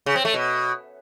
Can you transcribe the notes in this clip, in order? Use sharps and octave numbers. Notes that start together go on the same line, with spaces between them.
C#3
C4
A3
B2